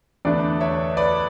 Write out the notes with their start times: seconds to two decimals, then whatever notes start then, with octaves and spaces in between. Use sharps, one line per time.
0.25 E2 D3 A3 D4 B4 D5
0.61 C#5 E5
0.97 B4 D5